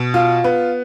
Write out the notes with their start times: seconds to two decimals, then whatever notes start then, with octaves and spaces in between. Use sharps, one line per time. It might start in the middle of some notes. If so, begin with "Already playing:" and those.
Already playing: B2
0.14 F4
0.44 B3